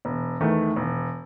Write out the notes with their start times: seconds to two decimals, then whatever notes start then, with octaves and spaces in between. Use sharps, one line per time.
0.05 E1
0.40 E2 D#3 A3
0.76 E1